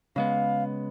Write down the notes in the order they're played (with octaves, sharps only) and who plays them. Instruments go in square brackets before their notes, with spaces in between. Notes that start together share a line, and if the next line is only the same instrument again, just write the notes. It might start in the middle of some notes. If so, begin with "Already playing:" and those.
[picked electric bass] C#3 G#3 B3 [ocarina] F5